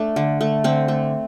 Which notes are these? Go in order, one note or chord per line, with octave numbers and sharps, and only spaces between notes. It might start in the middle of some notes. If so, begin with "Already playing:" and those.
Already playing: A3 D4
D3
A3
D3 C4
A3